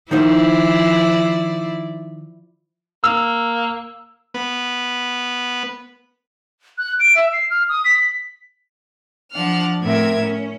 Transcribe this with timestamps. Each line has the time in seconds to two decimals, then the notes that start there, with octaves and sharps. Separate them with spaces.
0.11 D#3 F3 D#4 E4 C5 D5
3.04 A#3 E6
4.34 B3
6.78 F#6
7.00 D7
7.15 E5
7.33 C7
7.50 F6
7.69 D#6
7.85 B6
9.32 F3 D4 F#5 F6
9.81 A2 B3 C4 A#4 E5 G#6
10.19 C#4